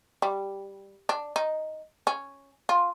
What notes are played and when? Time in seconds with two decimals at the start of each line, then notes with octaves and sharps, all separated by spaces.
0.22 G3
1.09 D4
1.36 D#4
2.07 C#4
2.69 F4